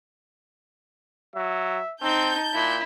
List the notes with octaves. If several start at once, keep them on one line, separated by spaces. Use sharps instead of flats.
F#3 E5
C4 D#4 A5 G6
A#2 E4